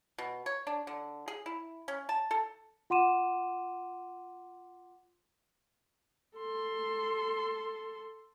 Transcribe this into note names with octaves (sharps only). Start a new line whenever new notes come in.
B2
C#5
D4
D3
G#4
E4
C#4
A5
A4
F4 F#5 C6 D6 D#7 E7
A4 C6